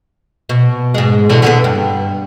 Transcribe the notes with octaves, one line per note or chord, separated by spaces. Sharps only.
B2
G#2 G#3
E2 B2 D3
D3 G3 B3
G2